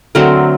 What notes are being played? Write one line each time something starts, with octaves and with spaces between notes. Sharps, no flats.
D3 F#3 A3 C4 A#4